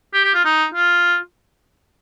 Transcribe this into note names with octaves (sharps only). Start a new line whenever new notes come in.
G4
G4
F4
D#4
F4